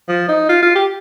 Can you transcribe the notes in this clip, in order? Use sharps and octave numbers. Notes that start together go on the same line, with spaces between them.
F3
D#4
F4
F4
G4